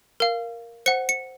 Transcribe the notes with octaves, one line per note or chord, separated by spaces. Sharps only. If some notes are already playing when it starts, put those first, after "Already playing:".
A#4 F5
C5 F#5 C#7
C#7